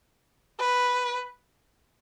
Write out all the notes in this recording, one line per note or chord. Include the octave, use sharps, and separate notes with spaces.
B4